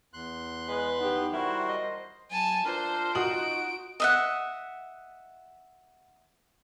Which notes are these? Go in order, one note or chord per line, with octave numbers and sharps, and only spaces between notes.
E2 C6 F#6
G#3 B4
B3 D#4 G4
G3 E4 F#4 A#4 C5
D#5
F#3 G#5 A5
D4 F4 A#4 C5
D#4 F#4 D#6 D7 F#7
D#5 E5 F#5